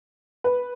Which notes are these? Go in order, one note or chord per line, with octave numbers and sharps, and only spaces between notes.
B4